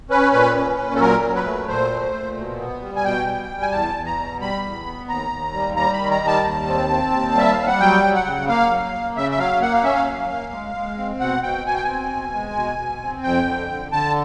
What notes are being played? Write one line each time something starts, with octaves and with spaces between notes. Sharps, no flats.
C#4 B4
A#2 B4
C#4
A#2
A4
F#3 A#4
F#3
B4
A3
A#2 C5
A3
A#2
B2
B3
G3
G#5
B2 G5
G3
G3
G#5
E2 A5
E2
A#5
B2
G3 B5
E2
B3
D#2 A#5
D#2
G3
G3 A#5
B5
D#3
A#5
G3
A5
D#2
C4
C4
D#2
G3 E5
F5
G3
F#5
F#3 G5
F#3
F#5
C#3
A#3 F5
F#3
A#3
C#3 E5
E5
F#3 F5
A#3 F#5
F5
C#4 E5
F5
F#3
A#3
G#3
G#3
C4
B2 F#5
B2 G5
B2 G#5
G5
C4 G#5
B2
G#3
B2
B2
C4
F2 G5
D3
D3
D3 A5